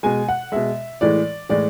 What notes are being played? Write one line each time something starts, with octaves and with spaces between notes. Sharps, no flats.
B2 G#3 G#5
F#5
B2 G#3 E5
A2 E3 G#3 D5
A2 E3 G#3 D5